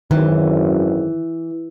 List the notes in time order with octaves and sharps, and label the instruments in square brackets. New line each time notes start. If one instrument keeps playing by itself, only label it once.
[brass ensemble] G#1 F#2 [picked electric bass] D#3 [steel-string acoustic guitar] E3